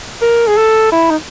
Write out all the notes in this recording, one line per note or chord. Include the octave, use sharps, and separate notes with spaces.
A#4
G#4
A4
E4
D#4